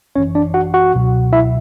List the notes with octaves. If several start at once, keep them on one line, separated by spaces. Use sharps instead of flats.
G#1 F#2 E3 C#4 C#5
D4 D5
F#4 F#5
F#4 F#5
C#2 B2 F#3
E4 E5